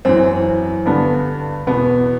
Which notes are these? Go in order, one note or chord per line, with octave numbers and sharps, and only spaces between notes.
F#2 E3 C4
G2 D3 B3
E2 B2 B3